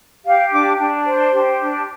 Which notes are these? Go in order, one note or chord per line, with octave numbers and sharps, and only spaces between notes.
G4 F5
D4 D6
D4
C5
G4
D4